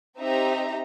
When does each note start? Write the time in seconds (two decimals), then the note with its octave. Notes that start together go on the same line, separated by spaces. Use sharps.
0.18 C4 D#4 G4 E5 A#5